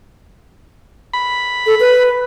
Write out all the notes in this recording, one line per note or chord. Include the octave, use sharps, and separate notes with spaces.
B5
A4
B4